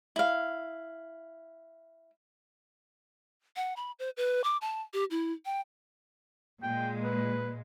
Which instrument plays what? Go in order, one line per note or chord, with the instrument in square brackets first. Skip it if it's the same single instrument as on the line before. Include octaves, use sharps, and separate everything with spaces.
[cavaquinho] E4 F5
[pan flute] F#5
B5
C5
B4
D6
A5
G4
E4
G5
[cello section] A#2 G#3 [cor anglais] G5
[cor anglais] B4